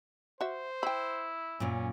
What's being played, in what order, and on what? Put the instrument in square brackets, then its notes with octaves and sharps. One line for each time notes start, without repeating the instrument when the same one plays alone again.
[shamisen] F#4 E5 [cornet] C5
[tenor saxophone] E4 [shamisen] G5 B5
[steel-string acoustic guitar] F#2 A#2 [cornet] C#4